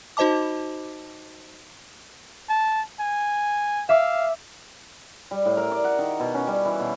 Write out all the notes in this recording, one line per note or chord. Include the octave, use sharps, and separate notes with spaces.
D#4 F#4 C5 D#5 A5 D6
A5
G#5
E5 F5 D6 E6
G3
A2
A#4
D5
F#5
D#3
B2
C#4
G3
E3
B2